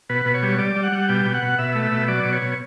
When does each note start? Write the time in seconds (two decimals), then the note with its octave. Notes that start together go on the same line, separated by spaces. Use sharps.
0.09 B2 B4
0.25 B2
0.34 C#5
0.42 G3
0.59 G3 D5
0.76 G3
0.83 F#5
0.92 G3
1.09 B2 G5
1.25 B2 G5
1.34 F#5
1.42 B2
1.58 B2 E5
1.75 A3
1.83 E5
1.92 B2
2.08 F#3 D5
2.25 B2
2.33 C#5
2.42 B2